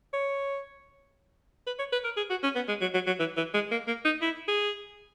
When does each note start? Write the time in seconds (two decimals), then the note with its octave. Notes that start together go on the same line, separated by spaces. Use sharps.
0.13 C#5
1.67 B4
1.79 C#5
1.92 B4
2.04 A#4
2.17 G#4
2.30 F#4
2.43 C#4
2.55 B3
2.68 G#3
2.81 F#3
2.94 F#3
3.07 F#3
3.19 E3
3.37 E3
3.54 G#3
3.71 A#3
3.87 A#3
4.05 D#4
4.21 E4
4.48 G#4